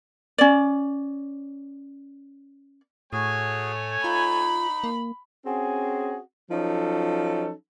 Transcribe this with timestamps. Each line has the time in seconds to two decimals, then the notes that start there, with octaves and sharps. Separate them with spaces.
0.38 C#4 D5
3.13 A2 A3 F#4 G#4 C#5 G#5
4.04 D#4 F4 B5
4.84 A#3
5.46 C4 C#4 F#4 G#4
6.51 F3 F#3 C#4 D#4 A4